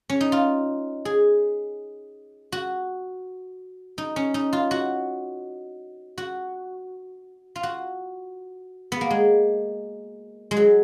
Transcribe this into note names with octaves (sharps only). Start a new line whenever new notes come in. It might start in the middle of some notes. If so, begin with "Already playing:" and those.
C#4
D#4
F4
G#4
F#4
D#4
C#4
D#4
F4
F#4
F#4
F4
F#4
B3
A#3
G#3
G#3
F#3